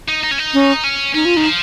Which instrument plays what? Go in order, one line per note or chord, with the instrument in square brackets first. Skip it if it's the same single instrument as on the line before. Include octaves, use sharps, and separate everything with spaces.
[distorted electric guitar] D#4
D#4
C#4
D#4
[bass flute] C#4
[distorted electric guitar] C#4
[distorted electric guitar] C#4 [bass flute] D#4
[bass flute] F4
[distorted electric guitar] D#3 [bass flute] D#4
[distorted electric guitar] F3